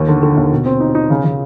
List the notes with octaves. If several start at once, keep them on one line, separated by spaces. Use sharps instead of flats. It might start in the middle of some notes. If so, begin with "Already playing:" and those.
Already playing: D#2 D#3
D3
D3
D#2
B2
C4
D#4
D#4
C#3
C#3